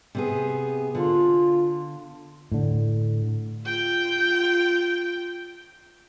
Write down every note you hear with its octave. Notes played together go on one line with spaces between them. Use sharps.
C3 B3 G#4
D3 F4
A2 D3
F4 G5